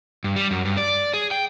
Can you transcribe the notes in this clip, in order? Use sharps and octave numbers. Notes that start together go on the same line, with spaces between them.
G2
G3
F#2
G2
D5
G#4
G5